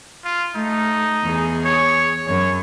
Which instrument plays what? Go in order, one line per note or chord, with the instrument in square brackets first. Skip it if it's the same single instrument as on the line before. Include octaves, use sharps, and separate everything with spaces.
[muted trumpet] F4
[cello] A3 [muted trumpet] D#4
[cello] E2 G#4
[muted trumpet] C#5
[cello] F#2 [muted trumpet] C#5